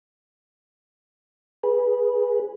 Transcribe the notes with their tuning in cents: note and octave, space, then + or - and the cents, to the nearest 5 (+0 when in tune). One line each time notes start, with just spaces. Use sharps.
G#4 -5 B4 -15